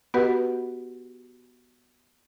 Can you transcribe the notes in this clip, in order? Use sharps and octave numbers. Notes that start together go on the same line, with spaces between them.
B3 F#4 G4 B4 D#5 F#5